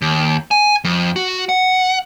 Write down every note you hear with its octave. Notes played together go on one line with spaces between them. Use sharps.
D#2
G#5
F2
F#4
F#5